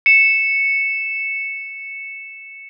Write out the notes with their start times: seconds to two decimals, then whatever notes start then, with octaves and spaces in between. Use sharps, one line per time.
0.06 C#7 E7